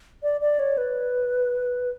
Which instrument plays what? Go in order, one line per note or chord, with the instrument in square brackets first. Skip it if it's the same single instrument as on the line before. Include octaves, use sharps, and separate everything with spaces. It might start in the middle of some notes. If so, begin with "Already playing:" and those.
[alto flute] D5
D5
C#5
B4